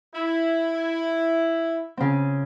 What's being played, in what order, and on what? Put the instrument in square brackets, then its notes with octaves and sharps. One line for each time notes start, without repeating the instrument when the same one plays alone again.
[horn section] E4
[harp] C#3 C4